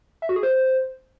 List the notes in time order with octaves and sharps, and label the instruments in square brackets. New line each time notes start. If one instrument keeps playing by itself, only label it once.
[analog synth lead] E5
F#4
G#4
C5